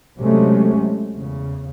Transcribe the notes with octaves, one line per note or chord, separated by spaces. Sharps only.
C3 F#3 G#3 A3 C#4
E2 C#3